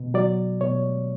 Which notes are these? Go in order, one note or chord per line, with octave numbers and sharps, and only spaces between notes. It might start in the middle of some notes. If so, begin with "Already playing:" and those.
Already playing: B2
F#3 D5
B2 C#5